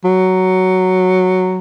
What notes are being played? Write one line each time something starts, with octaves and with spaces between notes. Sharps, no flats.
F#3